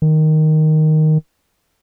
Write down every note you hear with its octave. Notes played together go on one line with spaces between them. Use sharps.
D#3